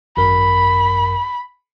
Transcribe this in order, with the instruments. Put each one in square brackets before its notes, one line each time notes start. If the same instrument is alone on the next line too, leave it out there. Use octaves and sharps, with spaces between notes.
[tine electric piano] G#1 F#2 A#4 [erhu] B5